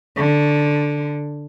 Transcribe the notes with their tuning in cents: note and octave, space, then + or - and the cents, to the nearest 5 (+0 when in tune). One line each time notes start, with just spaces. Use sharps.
D3 +0